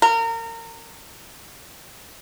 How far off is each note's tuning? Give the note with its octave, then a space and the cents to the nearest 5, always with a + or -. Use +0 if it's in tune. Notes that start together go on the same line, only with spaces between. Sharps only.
A#4 -30